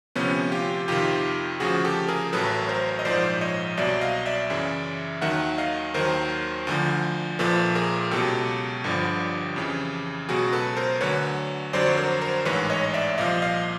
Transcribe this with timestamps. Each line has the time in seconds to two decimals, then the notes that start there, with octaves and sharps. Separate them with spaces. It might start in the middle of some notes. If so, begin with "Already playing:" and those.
0.15 D2 C3 F3 B3 C#4
0.52 F4 G4
0.88 F2 C3 D#3 F4 G4
1.60 D2 C#3 F3 F#4 G#4
1.85 G4 A4
2.09 G#4 A#4
2.33 A1 A2 F#3 A4 B4
2.69 A#4 C5
2.99 D#5
3.05 A#1 G#2 F3 C5 D5
3.41 C#5 D#5
3.77 C2 B2 F#3 D5 E5
4.01 D#5 F5
4.26 D5 E5
4.50 F#2 C#3 E3
5.22 D#2 D#3 F#3 E5 F#5
5.58 D#5 F5
5.94 D#2 D#3 F#3 A#4 C5
6.67 D2 D3 F3
7.39 A#1 A#2 F3 A4 B4
7.75 G#4 A#4
8.11 C#2 B2 F#3 G4 A4
8.84 G1 G2 D3 F3
9.56 F2 C#3 E3
10.29 C#2 B2 F#3 F#4 G#4
10.52 A4 B4
10.77 A#4 C5
11.00 D2 D3 F#3 B4 C#5
11.73 F2 D3 F#3 C5 D5
11.86 C#5
11.97 A#4 C5
12.21 A#4 C5
12.45 A1 G#2 E3 B4 C#5
12.70 C#5 D#5
12.94 D5 E5
13.18 C2 A#2 F3 D#5 F5
13.42 D#5 F5